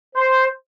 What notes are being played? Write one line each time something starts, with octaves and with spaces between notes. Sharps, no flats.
C5